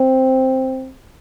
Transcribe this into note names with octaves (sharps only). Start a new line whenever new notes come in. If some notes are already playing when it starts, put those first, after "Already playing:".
Already playing: C4